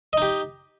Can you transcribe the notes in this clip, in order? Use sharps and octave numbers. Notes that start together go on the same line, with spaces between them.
D#4 G4 D#5